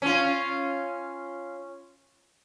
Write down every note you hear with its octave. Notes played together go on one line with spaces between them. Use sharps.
C#4 F4